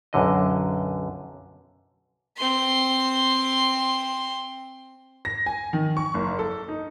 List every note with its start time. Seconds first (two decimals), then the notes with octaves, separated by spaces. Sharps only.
0.13 B1 F#2 D3 D#5
2.37 C4 C6
5.25 A#6
5.46 G#5
5.73 D#3
5.97 C#6
6.14 F#1
6.39 A4
6.68 D#4